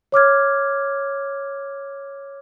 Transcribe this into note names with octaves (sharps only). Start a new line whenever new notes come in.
C#5 D6 F6 G#6